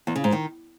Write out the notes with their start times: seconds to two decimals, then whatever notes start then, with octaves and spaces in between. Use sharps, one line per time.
0.07 E2
0.16 C#3
0.24 G#2
0.32 D#3